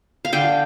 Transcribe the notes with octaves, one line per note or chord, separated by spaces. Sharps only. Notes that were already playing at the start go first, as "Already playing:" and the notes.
F5
D3 G5